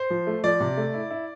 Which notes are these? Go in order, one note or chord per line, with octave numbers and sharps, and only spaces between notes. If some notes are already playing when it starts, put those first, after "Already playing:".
Already playing: C5
F3
A3
F3 D5
C3
A3
E4
E4